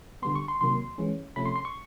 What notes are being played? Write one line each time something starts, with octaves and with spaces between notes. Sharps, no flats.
D3 G3 B3 C6
C#6
C6
C3 D#3 F#3 A#3 C6
E3 G#3 C#4
C3 F3 A3 C#4 B5
C6
C6
C#6